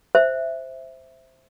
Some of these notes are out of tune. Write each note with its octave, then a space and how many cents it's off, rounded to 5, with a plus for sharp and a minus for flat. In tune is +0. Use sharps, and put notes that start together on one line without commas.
C5 +0 E5 +0